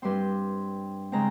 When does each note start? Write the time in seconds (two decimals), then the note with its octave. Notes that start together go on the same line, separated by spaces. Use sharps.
0.02 G2 G3 C4 C6
1.12 C#3 G#3 C4 A#5